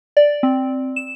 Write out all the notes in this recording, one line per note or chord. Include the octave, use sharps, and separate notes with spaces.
D5
C4
E7